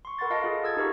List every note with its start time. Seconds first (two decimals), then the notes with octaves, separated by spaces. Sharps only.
0.05 C6 C#6
0.19 A4 A#4 F#5 B5 C6 A6
0.30 F4 D#5 F5 A5 A#6 D7
0.44 F4 G#4 A4
0.64 D#6 E6 G#6 A6
0.77 D#4 G4 A#4 E5 A#5 C#6